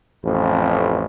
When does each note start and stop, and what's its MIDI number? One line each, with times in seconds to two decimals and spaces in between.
0.23 1.05 33
0.23 1.05 41